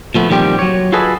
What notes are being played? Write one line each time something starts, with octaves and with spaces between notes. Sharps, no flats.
A#2 F3 A3 B3
A#2 D#3 F3 G3 C4 G4
F#3 C#5
F4 F#4 G#4 A4 B4 D#5